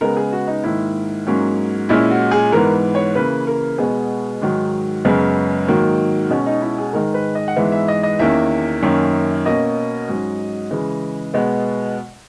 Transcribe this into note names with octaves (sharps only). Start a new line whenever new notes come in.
C#3 G#3 B3 A#4
G#4
F#4
D#4
G#2 D#3 A#3 E4
G#2 F#3 A#3 C#4
A#2 G#3 C#4 E4
F#4
G#4
G#2 E3 B3 A#4
C#5
C#3 E3 A#3 B4
A#4
B2 G#3 B3 G#4
G#2 D#3 F#3
F#2 C#3 G#3 B3
G#2 D#3 F#3 A#3
B2 G#3 C#4
D#4
E4
G#4
G#2 D#3 G#3 A#4
B4
D#5
F#5
G#2 E3 G#3 B3 E5
E5
D#5
D#5
E2 D#3 A#3 C#4 E5
F#2 D#3 A#3 C#4
B2 A#3 C#4 D#5
G#2 F#3 C#4
C#3 E3 G#3
B2 G#3 B3